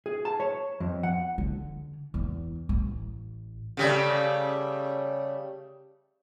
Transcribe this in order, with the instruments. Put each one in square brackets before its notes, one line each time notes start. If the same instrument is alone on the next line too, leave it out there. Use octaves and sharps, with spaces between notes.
[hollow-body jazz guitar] G#4
A5
C#5
F2
F#5
[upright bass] D3
E2
A1
[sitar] C#3 G3 A3